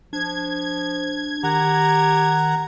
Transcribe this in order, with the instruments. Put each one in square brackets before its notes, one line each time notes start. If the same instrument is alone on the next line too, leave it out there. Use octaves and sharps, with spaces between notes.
[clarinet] F3 [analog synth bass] D4 [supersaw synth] G#6
[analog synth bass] D#3 [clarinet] G4 [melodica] F#5 A#5